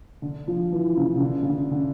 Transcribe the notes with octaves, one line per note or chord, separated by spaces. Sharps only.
D3
F3
E3
C#3
C#3
D3
C#3
D3
D3